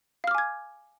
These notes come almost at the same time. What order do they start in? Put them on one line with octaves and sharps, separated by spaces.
F5 F6 D6 G#5 G#6